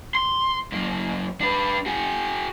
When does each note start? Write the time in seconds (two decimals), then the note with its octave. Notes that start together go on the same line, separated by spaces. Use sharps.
0.15 C6
0.72 F#2 A#3
1.41 D4 B4
1.86 F#4 G#4